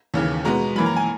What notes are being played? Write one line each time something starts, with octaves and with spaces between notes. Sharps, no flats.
D#2 C#3 E3
B2 G#3 B3 A#5
F#2 E3 A#3 B5
A#5
G#5